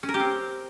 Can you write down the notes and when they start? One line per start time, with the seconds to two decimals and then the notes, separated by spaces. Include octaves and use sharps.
0.03 C#4
0.09 A#4
0.14 G4
0.20 C4